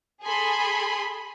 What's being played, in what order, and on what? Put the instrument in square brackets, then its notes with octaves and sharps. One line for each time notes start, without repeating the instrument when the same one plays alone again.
[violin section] G#4 A4 G#5 B5 C6